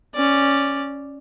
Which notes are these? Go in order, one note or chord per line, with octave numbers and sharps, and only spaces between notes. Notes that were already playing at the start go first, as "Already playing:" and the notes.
C#4 D5